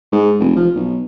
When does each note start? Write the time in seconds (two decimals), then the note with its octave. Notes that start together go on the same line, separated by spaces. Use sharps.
0.13 G#2
0.40 F1
0.56 F3
0.76 B1